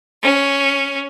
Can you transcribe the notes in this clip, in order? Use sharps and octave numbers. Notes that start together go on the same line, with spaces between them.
C#4